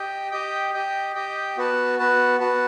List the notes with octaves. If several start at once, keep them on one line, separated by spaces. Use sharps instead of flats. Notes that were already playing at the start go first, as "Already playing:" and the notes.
Already playing: G4 D#5 G5
G4 D#5 G5
G4 D#5 G5
G4 D#5 G5
B3 F#4 B4 F#5 A5
B3 F#4 B4 F#5 A5
B3 F#4 B4 F#5 A5